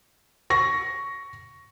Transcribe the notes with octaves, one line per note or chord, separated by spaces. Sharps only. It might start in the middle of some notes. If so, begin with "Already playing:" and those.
C#6 A#6